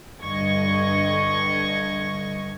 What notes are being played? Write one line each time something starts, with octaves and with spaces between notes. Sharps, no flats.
G2 D3 D#5 C#6 G#6